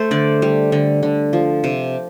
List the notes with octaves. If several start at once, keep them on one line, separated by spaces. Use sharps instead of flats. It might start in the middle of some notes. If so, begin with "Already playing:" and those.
Already playing: A3 A4 C5
D3 D5
G3
D3
D3
F3
C3